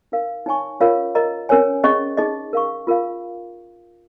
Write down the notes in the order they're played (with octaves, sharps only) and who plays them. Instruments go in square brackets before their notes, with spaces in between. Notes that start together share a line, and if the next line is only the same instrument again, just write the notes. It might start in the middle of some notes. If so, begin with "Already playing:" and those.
[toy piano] D#4 A#4 F5
D#4 C#5 G#5 C#6
C#4 F4 A#4 C#5 F5
A#4 D#5 A#5
C#4 A#4 C#5 G#5
C#4 G#4 D#5 C#6
D#4 G#4 D#5
A#4 F5 C#6
F4 A#4 F5